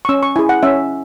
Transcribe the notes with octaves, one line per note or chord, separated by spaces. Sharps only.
C#6
C#4 E6
C#6
E4 G#4 G#5
F#5
C#4 E5